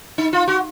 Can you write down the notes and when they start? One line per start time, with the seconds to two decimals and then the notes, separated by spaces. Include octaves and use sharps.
0.18 D#4
0.33 F4
0.48 F#4